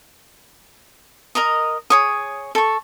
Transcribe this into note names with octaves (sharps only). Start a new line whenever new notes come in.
A#4 D#5 A#5 D#6
G#4 C#5 D#6
A4 C#6